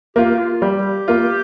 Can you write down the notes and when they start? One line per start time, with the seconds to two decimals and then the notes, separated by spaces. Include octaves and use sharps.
0.16 A#3 F4 G4
0.39 F4
0.62 G3 G4
1.08 A#3 F4